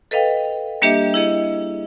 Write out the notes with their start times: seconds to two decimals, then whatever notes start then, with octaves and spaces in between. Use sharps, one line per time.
0.11 A4 B4 D#5 F5 G5
0.82 G3 A#3 D4 G4 D#5 E5
1.14 E4 G#4 D#5